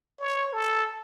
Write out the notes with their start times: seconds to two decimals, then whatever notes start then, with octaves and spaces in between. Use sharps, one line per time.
0.19 C#5
0.53 A4